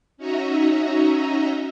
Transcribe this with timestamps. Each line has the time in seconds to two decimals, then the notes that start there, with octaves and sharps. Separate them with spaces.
0.17 C#4 D#4 F#4 D#5 E5 A#5